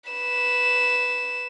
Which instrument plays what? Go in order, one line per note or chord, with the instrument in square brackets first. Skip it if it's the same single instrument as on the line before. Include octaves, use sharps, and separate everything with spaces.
[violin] B4 E7